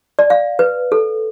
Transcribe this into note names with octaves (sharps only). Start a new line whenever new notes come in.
D5
F5
B4
A4